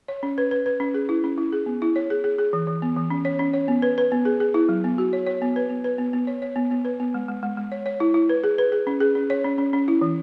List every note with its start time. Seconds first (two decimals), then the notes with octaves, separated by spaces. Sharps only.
0.08 C#5
0.23 C#4
0.38 B4
0.51 B4
0.66 B4
0.80 C#4
0.94 G#4
1.09 E4
1.24 C#4
1.38 E4
1.53 G#4
1.66 B3
1.82 E4
1.96 C#5
2.10 G#4
2.24 G#4
2.38 G#4
2.53 E3
2.67 E3
2.82 B3
2.96 E3
3.10 C#4
3.25 C#5
3.39 C#4
3.54 C#5
3.68 B3
3.82 B4
3.98 B4
4.12 B3
4.25 G#4
4.40 G#4
4.54 E4
4.69 F#3
4.84 B3
4.98 F#4
5.13 C#5
5.27 C#5
5.42 B3
5.56 B4
5.70 B3
5.84 B4
5.98 B3
6.13 B3
6.27 C#5
6.42 C#5
6.56 B3
6.71 B3
6.85 B4
7.00 B3
7.14 G#3
7.28 G#3
7.43 G#3
7.57 G#3
7.72 C#5
7.86 C#5
8.00 E4
8.14 E4
8.29 B4
8.44 G#4
8.58 B4
8.72 G#4
8.87 C#4
9.00 G#4
9.15 C#4
9.30 C#5
9.44 C#4
9.58 C#4
9.73 C#4
9.88 E4
10.01 E3